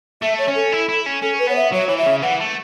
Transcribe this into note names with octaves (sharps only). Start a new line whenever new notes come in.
A3 E5
C#5
C#4
A4
E4
E4
C#4
C#4 A4
B4
B3 C#5
E5
F#3 C#5
E3 C#5
E5
C#3
E3 F#5
A3